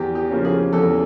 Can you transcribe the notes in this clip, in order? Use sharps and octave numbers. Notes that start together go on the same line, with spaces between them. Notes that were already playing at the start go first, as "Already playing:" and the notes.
Already playing: E2 G4
G4
C#3 F3 A#3 C#4
G#4
E2 A4